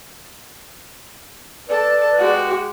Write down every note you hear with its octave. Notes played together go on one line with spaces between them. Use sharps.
A4 B4 D5 A5
G#3 F#4 G4